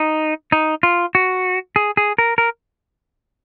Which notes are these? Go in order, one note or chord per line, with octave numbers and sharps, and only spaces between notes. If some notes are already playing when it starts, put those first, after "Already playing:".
Already playing: D#4
D#4
F4
F#4
G#4
G#4
A#4
A#4